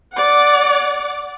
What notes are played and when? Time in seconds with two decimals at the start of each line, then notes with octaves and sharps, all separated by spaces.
0.13 D5 F#5